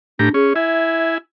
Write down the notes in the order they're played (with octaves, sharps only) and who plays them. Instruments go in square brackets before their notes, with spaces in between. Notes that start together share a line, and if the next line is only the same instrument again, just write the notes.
[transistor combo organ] A2 G4 A#5 [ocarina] D4
[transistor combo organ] C#4 [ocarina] G#4
[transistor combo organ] E4 G#5 [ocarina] E5